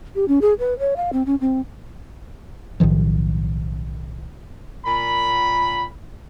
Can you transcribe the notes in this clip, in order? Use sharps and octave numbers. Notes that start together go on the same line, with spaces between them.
G4
C#4
G#4
B4
C#5
F5
C4
C#4
C4
B1 A2 D#3 F3
A#2 B5